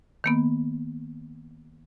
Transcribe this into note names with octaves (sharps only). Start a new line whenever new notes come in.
D#3 A#3 B3